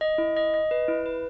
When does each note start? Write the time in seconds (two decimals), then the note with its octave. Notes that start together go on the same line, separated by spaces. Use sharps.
0.01 D#5
0.18 E4
0.36 D#5
0.54 D#5
0.71 B4
0.88 E4
1.06 B4